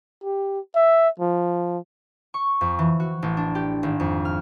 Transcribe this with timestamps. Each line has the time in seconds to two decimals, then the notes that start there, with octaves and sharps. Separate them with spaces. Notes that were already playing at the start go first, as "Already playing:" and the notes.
0.24 G4
0.76 E5
1.20 F3
2.34 C#6
2.61 F2
2.79 E3
3.00 F#4
3.22 A1
3.37 D4
3.55 G4
3.83 G#1
4.00 F2
4.25 F6